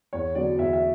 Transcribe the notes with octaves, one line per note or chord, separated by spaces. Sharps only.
E2 C#5
D3 F#3 B3 D5
E2 E5
E5